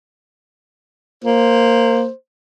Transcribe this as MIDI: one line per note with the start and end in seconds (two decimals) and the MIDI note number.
1.24 2.09 58
1.24 2.15 72